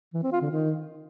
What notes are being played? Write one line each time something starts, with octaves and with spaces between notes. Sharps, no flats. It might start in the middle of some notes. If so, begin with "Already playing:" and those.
E3
C4
F4
D3
D#3